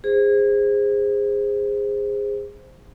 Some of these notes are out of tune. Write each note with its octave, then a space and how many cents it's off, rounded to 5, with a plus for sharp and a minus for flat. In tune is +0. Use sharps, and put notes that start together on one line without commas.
G#4 -25 C5 +0